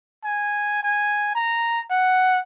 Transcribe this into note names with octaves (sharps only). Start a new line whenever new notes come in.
G#5
G#5
A#5
F#5